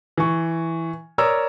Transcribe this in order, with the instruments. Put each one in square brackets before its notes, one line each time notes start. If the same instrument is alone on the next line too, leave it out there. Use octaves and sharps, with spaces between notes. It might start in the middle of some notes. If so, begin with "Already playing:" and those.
[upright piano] E3 C#6
A#4 C#5 D5 A#5 D#6 E6